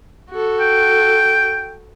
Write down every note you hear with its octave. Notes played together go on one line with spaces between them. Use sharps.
F#4 A4
G5